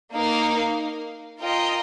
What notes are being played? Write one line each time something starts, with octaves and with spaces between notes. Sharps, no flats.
A#3 D#4 A#4 F5
F4 A#4 D#5 G5